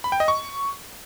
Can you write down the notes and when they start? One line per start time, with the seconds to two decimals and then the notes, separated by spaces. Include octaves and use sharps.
0.04 B5
0.12 G5
0.20 D#5
0.28 C#6